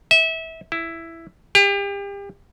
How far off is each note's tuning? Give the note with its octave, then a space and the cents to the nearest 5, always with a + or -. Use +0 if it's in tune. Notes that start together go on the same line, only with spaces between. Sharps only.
E5 -25
E4 +5
G4 +35